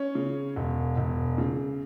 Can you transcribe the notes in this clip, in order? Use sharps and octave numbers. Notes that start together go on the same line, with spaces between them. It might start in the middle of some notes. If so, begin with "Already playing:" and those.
Already playing: C#4 C#5
C#3
E1
E1
C#3